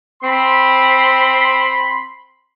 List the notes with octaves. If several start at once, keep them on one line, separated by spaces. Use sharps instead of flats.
C4 B5 C6